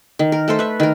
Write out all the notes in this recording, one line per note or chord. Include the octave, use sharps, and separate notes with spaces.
D#3
A#4
A3 A4 C5
B4 E5
D#3 A#4